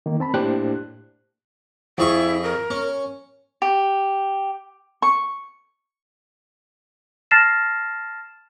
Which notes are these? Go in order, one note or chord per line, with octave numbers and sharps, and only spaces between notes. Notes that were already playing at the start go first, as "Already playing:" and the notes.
D#3 A#3
C4 A5 B5
A2 A#3 D4 G4 C5 F#6
F2 E4 G#4 C#6
A#4
C#4
G4
C#6
A5 F6 A6 A#6 C7 E7